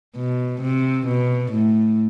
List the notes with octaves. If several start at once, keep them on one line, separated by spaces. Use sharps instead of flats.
B2
C3
B2
A2